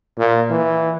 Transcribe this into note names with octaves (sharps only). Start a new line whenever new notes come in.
A#2
E3